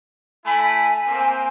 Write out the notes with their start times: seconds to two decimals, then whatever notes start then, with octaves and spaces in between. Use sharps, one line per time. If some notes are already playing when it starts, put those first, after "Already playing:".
0.45 A3 E4 G#5 B5
1.07 A#3 C4